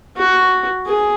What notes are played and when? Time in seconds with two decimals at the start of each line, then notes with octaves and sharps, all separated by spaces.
0.17 F#4
0.86 G#4